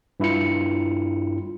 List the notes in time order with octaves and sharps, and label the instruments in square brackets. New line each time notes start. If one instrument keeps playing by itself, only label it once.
[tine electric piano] G2 E4 F4 C#7